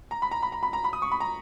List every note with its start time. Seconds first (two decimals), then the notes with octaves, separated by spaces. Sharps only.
0.11 A#5
0.22 B5
0.31 A#5
0.43 B5
0.52 A#5
0.63 B5
0.73 A#5
0.84 B5
0.93 D#6
1.02 C#6
1.12 B5
1.20 A#5